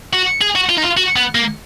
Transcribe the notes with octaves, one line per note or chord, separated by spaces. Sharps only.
F#4
G#4
F#4
F4
D#4
F4
F#4
B3
A#3